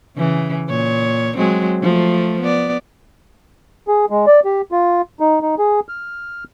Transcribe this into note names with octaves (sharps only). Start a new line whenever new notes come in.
C#3 E3
A#2 C#5
F#3 G#3 C4
F3 A3
B3 D5
G#4
G#3
D5
G4
F4
D#4
D#4
G#4
F6